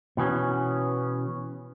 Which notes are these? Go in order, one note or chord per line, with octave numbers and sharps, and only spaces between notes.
B2 E3 B3 C#4